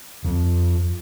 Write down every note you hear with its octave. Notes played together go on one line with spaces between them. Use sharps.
F2